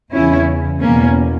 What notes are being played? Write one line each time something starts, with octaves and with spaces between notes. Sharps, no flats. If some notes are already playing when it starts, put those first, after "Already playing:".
E2 C#3 E3 C#4 E4
E2 B2 A#3 C#4